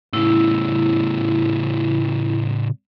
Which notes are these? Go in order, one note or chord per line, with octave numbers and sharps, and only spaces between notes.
A2 C#3 E4